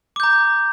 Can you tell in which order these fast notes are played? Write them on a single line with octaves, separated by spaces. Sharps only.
D6 G6 A#5